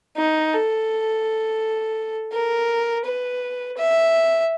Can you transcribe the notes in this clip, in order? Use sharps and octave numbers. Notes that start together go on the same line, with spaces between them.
D#4
A4
A#4
B4
E5